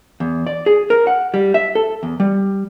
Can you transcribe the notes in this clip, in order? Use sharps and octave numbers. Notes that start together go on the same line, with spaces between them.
E2
D5
G#4
A#4
F#5
G3
E5
A4
E2
G3